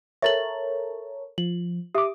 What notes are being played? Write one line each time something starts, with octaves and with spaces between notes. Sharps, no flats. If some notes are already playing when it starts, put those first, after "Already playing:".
A4 A#4 C#5 E5 A6 F#7
F3 F#7
G4 E5 D6 D#6